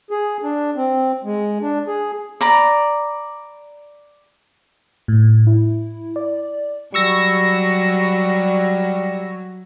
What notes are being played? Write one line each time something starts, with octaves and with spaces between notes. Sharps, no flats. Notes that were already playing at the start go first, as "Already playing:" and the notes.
G#4
D4
C4
G#3
D4
G#4
D5 A#5 B5
A2
E4
D5
F#3 G3 C#6 E6 A#6